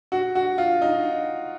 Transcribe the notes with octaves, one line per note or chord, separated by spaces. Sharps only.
F#4
F#4
F4
D#4